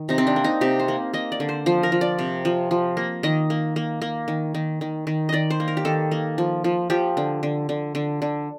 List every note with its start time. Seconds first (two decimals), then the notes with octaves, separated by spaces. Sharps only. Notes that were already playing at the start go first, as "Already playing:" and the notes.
Already playing: D#3
0.09 C3 D#4
0.18 C4
0.27 D4
0.36 A#3
0.44 D#4
0.61 C3 G4
0.80 C5
0.88 A#3
1.13 A#3 D#5
1.32 D5
1.40 D3
1.49 C5
1.66 F3 C5
1.83 A#4
1.92 F3
2.01 D5
2.19 C3
2.45 F3
2.71 F3
2.97 A#3
3.23 D#3 D#5
3.50 A#3
3.76 A#3
4.02 A#3
4.28 D#3
4.55 D#3
4.81 D#3
5.07 D#3
5.29 D#3 D5 D#5
5.50 C5
5.60 A#3
5.68 A#4
5.77 G4
5.85 D#3 A4
6.11 A#3
6.38 F3
6.64 F3
6.90 F3 G4
7.17 D3
7.43 D3
7.69 D3
7.95 D3
8.22 D3